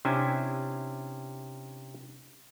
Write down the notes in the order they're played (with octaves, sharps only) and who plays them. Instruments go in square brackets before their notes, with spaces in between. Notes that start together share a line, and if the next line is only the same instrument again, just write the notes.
[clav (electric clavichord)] C3 C#4 D4 E4 C5 G#5